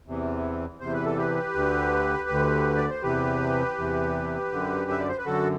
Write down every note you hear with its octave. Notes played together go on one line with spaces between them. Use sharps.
E2 C3 E3
E2 C3 E3 C5
B4
A4
G4 B4
D2 D3
D2 D3
D5
C5
E2 C3 E3 G4 B4
E2 C3 E3
F#2 D3
E5
D5
C5
B4
F#2 D3 F#4 A4